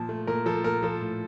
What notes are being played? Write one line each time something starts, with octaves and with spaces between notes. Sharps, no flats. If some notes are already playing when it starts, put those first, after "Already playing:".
Already playing: A#2 F3 A5
A3
A#2 A#4
F3 A4
A#2 A#4
F3 A4
A2